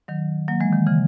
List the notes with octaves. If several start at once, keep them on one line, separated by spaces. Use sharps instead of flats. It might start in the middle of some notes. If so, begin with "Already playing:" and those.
D#3 F#3
F#3 A#3
E3 G#3
D#3
C#3 E3